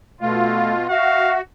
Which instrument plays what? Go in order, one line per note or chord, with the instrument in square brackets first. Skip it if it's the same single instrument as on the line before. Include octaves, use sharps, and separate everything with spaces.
[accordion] B2 F4 [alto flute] A3
[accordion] F#4 [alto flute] E5 [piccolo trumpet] F5